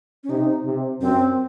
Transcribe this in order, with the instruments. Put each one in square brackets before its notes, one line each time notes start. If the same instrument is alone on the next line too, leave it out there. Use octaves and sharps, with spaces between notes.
[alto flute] C#4
[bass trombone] C3 [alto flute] D#4
[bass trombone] C3
[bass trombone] F#2 [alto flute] C4